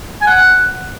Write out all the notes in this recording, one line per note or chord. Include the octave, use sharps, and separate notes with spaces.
G#5
F#5